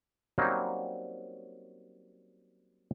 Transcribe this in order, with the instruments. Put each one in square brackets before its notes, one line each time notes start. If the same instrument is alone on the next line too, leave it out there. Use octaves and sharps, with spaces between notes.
[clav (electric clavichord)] F#3 G3 A#3 C4 C#4 D#4